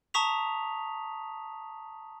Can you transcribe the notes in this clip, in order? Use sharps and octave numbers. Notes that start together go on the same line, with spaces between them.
A5 A#5 C#6 D#6 B6 F7